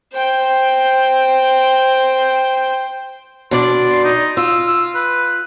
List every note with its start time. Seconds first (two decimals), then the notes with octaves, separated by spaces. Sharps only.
0.14 C5 G5
3.51 B2 D4 D5 C6
4.04 D#4
4.37 F4 E6
4.67 E6
4.94 B4